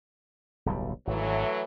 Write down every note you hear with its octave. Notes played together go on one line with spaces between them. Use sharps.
D1 B1 G3
G#1 E3 F#3 A3